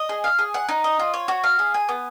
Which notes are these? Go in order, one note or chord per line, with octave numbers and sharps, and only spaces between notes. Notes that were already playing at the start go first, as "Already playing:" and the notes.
Already playing: D#5
G#4
F5
G#4
F#5
D#4
D#5
F4
C#5
F#4
F5
G#4
G#5
B3